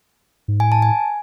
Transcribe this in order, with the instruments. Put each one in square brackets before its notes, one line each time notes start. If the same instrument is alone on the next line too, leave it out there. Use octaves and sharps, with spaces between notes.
[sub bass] G#2
[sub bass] A2 [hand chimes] G#5
[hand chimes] A5
G#5